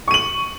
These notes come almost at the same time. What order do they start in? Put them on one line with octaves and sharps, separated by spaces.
C#6 D#7 F#7